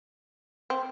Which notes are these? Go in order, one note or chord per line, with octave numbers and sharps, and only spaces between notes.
C4